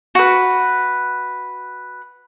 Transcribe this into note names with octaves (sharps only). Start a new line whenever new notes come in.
F#4 B4